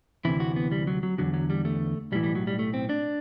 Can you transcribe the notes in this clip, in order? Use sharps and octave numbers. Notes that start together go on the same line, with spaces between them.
D2 C3 E3 E4
F#4
B3
G3
F#3
F#3
E2 D3 F#3
F#3
G3
A3
B1 A2 E3 G3
G3
F#3
G3
A3
C4
D4